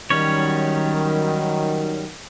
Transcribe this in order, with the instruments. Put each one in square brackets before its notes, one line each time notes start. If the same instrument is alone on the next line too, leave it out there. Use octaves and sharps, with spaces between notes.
[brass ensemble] D#3 F#3 [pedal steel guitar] G3 C#4 C#5